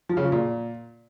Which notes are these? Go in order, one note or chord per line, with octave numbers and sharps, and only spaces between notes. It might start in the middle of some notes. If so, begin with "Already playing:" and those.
F3
C#3
F3
A#2